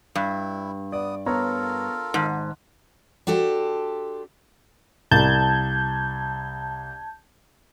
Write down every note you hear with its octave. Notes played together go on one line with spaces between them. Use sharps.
G2 E4
B3 D5 D#6
B3 F4 A4 A#4 C#5 A#5
G#1 G#2 A5
D4 F#4 G4 A4 C5
C2 A5 G6 G#6